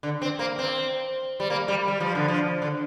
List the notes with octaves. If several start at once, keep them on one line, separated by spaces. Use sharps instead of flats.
D3
C4
A#3
C4
G3
A#3
G3
G3
F3
D3
F3
D3